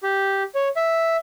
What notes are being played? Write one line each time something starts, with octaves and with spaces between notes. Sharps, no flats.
G4
C#5
E5